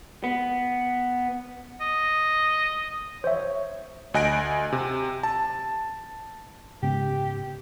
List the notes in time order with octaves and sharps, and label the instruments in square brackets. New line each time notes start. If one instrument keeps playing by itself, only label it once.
[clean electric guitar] B3
[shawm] D#5
[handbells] C5 E5 [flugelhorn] C#5
[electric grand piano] D2 D#5 G#5 F#6 A#6 D7
C3
A5
[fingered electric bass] G#2 C#3 B3 [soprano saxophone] G4